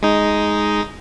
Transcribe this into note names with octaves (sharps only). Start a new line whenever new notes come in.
G#3 D#4